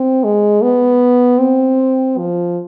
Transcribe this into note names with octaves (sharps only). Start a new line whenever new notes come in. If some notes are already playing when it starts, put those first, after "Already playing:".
Already playing: C4
G#3
B3
C4
F3